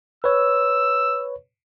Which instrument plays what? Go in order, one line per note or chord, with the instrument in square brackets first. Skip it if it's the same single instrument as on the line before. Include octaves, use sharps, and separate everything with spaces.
[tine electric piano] B4 C#5 [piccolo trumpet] E6